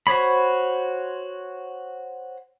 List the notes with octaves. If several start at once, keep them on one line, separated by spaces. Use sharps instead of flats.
F#4 C5 C#5 B5